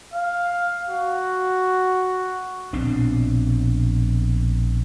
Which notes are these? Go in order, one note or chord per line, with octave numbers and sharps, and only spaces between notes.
F5
F#4
A#1 B2 C4 D4